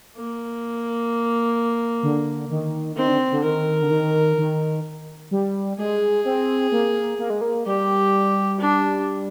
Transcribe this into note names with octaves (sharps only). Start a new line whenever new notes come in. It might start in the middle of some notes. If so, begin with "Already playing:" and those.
A#3
D3
D#3
D#3 C4
D3
D3
D#3 A#4
D3
D#3
D#3
G3
G#3 G#4
C4
A#3
A#3
G#3
A#3
G3 G4
D4